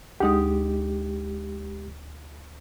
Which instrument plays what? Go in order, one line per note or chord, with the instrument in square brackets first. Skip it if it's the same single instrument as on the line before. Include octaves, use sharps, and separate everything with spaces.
[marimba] D2 D#4 D#6 [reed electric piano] G#3 G4